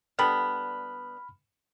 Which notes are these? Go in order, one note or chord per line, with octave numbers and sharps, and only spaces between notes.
D3 G3 B3 B5 F6